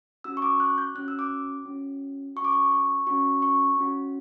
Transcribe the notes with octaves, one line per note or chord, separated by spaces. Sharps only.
C#4 F#4 E6
C#6
D6
F#6
G6
C#4 F#4 F#6
E6
D6
C#4 F#4
C#4 F#4 C#6
D6
C#6
C#6
C#4 F#4 C#6
C#6
C#4 F#4